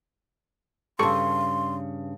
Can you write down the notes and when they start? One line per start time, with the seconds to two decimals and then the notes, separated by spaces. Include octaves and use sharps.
0.99 G2 C#3 G4 A4 C6 C#6